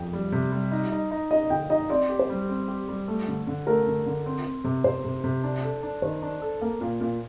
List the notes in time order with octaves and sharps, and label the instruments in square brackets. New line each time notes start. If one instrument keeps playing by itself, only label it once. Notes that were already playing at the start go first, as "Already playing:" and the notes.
Already playing: [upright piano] F2 [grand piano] G5
[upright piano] G3
C3
G3
D#4
D#4
D#4
[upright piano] D#4 [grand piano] D#5
[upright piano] D3 [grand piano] G5
[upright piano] D#4 [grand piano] D#5
[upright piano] C4 [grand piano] D5
[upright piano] G4
[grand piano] C5
[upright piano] G3
C4
G4
G3
A3
D3
D3
[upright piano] A3 [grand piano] A#4
[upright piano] D3
D3
C4
C4
C3
[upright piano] C3 [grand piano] C5
[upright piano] C3
C3
D4
A4
D4
[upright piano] D#3 [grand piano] C5
[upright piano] D4
A4
A#3
A#2
A#2